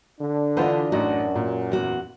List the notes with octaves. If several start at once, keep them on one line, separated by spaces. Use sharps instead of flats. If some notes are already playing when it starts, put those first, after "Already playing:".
D3 D4
E3 F4 B4 C5 D#5 F#5
A1 F#2 D#4 F#4
A#2
E2 F#4